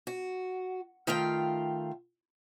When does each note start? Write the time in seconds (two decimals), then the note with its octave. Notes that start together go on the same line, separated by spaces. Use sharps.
0.07 F#4
1.07 D#3 A3 F4 F5 G5